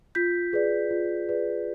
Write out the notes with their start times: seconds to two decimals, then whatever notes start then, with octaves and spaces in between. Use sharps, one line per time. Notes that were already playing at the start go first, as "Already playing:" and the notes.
0.15 F4 G6 B6
0.53 G#4 B4 D5
0.91 F4
1.29 G#4 B4 D5